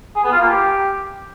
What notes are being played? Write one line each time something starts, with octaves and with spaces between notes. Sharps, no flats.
G#4
B3
F4
A#3
G4